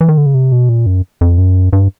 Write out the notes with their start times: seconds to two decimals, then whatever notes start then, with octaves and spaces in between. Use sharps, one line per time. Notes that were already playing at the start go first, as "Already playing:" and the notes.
0.01 E3
0.08 D#3
0.17 D3
0.26 C#3
0.34 C3
0.52 B2
0.69 A#2
0.86 F#2
1.21 F2
1.38 F#2
1.73 G2